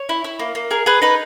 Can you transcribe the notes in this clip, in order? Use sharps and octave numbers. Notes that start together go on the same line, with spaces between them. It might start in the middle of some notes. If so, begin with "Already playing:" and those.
Already playing: C#5
E4
E4
A#3
A#3
G#4 A#4
G#4 B4
D#4 B4